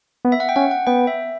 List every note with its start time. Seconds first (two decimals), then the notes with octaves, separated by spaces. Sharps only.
0.25 B3
0.32 E5
0.40 F#5
0.49 G5
0.56 C#4 F#5
0.71 F#5
0.87 B3 G5
1.07 E5